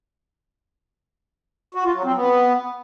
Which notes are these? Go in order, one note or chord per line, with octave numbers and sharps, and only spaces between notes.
F#4
F4
F#3
C4
B3